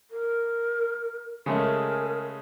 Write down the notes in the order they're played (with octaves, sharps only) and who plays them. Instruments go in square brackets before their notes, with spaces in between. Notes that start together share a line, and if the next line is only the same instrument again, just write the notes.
[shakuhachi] A#4
[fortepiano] C#3 G#3 A3 [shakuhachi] A#4 [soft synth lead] G#5